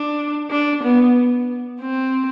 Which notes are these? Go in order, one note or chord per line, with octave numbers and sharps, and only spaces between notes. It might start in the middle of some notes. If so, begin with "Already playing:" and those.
Already playing: D4
D4
B3
C4